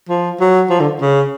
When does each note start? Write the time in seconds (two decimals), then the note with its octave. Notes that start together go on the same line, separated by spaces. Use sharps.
0.09 F3
0.40 F#3
0.70 F3
0.80 D3
1.01 C#3